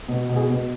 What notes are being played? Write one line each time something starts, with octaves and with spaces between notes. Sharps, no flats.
B2
B2
G#4
B2